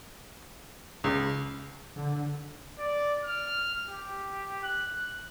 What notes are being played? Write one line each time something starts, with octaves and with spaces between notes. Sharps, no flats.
C#2
D3
D5
F6
G4
F#6